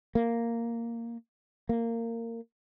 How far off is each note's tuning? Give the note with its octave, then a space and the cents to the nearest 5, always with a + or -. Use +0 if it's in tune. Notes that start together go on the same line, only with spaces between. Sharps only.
A#3 -5
A#3 -20